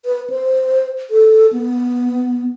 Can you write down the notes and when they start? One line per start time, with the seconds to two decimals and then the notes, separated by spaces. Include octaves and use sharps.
0.06 B4
0.30 C5
1.11 A4
1.53 B3